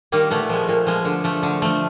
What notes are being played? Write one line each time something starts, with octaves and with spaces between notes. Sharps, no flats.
D#3 G3 A#3
A#2 A3 B3
F3 G#3
A#2
F3 G#3
D3
F3 A3
D3
F3 A3